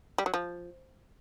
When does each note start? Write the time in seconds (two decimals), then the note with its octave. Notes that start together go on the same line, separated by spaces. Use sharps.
0.18 G3
0.26 F#3
0.34 F3